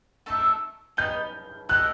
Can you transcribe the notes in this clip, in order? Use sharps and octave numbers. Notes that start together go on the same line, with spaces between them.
A3 D#4 A4 E5
B3 D#4 G4 D#5 G6
A3 D#4 G4 D#5 F#6